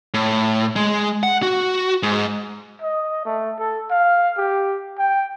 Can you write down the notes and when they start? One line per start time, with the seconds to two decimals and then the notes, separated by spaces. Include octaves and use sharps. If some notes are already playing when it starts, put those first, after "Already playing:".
0.14 A2
0.76 G#3
1.23 F#5
1.42 F#4
2.03 G#2
2.82 D#5
3.25 A3
3.59 A4
3.91 F5
4.38 G4
4.99 G5